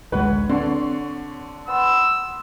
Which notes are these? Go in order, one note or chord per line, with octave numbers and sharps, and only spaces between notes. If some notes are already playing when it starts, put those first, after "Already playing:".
A1 D2 G#3 B4 C#5 F#5
D3 C4 C#5 A5 C6
B3 C6 E6